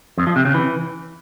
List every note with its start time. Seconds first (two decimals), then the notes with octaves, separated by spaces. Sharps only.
0.18 F2
0.27 F3
0.36 C3
0.45 C#3
0.54 E3